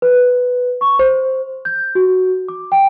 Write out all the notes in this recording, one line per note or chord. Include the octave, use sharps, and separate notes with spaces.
B4
C#6
C5
G6
F#4
D6
G5